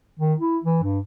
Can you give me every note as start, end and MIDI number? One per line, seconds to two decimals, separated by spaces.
0.20 0.34 51
0.40 0.58 64
0.64 0.79 52
0.83 0.99 43